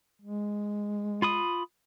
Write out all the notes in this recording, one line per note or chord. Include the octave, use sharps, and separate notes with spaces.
G#3
F4 B5 D#6